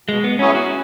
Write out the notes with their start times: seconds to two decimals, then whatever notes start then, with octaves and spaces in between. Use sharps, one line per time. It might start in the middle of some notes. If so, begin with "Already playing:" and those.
0.08 B2 G#3
0.24 B3
0.39 F#3 C#4 E4 G#4 C#5
0.55 F#4